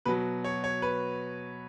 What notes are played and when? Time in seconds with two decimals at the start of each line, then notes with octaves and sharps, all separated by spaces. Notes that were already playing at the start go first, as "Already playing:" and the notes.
0.05 B2 F#3 B4
0.44 C#5
0.64 C#5
0.82 B4